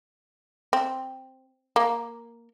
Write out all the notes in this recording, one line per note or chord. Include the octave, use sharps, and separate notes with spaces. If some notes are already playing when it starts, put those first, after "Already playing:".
C4
A#3